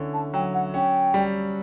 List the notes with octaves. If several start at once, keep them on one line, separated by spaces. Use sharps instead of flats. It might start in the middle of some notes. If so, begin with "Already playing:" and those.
Already playing: D3 C#4 E4
A5
F#3 G5
F#5
C#4 G5
G3